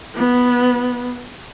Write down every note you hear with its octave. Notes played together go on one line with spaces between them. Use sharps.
B3